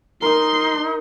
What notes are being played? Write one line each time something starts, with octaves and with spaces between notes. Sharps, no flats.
D#4 A#4 C6 D#6